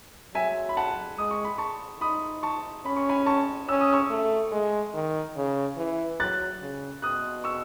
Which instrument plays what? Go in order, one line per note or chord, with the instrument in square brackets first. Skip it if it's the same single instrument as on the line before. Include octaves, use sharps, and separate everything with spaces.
[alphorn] F#3 [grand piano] E5 G#5
[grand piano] B5
F#5 A5
[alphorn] G#3 [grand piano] D#6
[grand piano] C#6
B5
A5 C#6
[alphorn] D#4 [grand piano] B5 D#6
[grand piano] A5 C#6
[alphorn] C#4 [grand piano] B5
[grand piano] C#6
G#5 B5
A5 C#6
[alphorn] C#4 [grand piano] E6
[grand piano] D#6
C#6 E6
[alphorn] A3
G#3
D#3
C#3
E3
[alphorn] F#3 [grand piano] F#6 A6
[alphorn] C#3
[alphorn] B2 [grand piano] D#6 F#6
[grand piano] C#6 E6